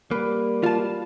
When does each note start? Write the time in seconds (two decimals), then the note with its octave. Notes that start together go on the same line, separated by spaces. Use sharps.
0.11 G3 A#3 B4
0.63 F4 A5